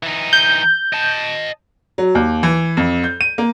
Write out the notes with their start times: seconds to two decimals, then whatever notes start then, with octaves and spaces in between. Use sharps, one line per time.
0.03 E3 D#4
0.33 G6
0.93 D#5 A5
1.98 F#3
2.15 D#2
2.43 E3
2.77 F2
3.04 G6
3.21 D#7
3.38 A#3